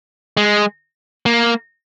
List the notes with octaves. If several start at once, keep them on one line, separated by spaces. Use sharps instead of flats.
G#3
A#3